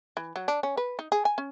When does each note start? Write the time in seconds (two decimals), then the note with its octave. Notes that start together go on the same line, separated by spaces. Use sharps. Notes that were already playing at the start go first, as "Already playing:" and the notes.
0.17 E3
0.36 F#3
0.48 D4
0.63 C#4
0.77 B4
0.99 D#4
1.12 G#4
1.25 G#5
1.38 C#4